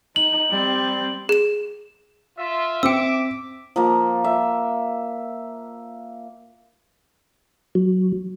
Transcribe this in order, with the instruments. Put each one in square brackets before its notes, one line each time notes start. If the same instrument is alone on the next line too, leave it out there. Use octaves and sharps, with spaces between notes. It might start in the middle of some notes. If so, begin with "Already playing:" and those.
[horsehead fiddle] D#4 [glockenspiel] F#7
[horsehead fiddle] G3 C4
[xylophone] G#4 E7
[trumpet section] F4 E5
[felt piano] C4 [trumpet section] E5 D6 [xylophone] G5 E6
[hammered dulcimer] F3 A#3
E5
[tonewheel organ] F#3